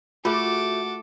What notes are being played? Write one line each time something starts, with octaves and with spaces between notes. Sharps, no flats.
A3 F4 F#4 G#4 A4 D6